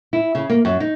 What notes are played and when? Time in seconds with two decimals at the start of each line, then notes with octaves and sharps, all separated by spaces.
0.13 E4
0.35 C#3
0.50 A#3
0.65 F#2
0.80 D#4